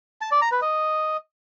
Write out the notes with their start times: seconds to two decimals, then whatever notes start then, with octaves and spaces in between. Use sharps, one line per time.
0.21 A5
0.31 D5
0.42 A#5
0.52 B4
0.62 D#5